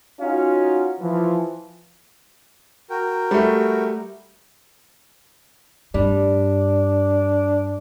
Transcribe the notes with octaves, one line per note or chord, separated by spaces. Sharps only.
C#4 D#4 F4 F#4 F5
E3 F3
F#4 A#4 G5
G3 A3
G2 G3 D4